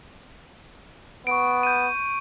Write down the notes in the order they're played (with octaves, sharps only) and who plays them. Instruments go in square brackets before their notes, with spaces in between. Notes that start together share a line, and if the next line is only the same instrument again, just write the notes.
[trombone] B3 [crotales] C#6 D7
[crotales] G6 D#7